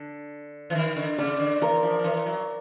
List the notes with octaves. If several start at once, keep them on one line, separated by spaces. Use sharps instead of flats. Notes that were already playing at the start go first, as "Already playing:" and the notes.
Already playing: D3
E3
D#3
D3
C#3 D5
D3
E3 A#4
F3
F3
E3
F#3